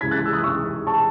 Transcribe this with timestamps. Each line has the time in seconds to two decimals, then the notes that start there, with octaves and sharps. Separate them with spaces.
0.01 C#2 C#3 E3 G#6 B6
0.11 F#6 A6
0.26 E6
0.33 D#6 F#6
0.44 C#6 E6
0.87 A5 C#6